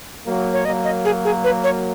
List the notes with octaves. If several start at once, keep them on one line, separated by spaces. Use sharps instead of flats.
F#3 A#3
C#5
F#3 A#3 D#5
D#5
G#4
G#4
B4
C#5